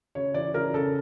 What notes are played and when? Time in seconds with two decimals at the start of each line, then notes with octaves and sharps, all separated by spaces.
0.15 C#3 C#5
0.34 E3 D5
0.54 C#3 A#4
0.74 C#3 A4